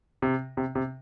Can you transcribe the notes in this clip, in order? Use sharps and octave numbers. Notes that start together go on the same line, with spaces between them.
C3
C3
C3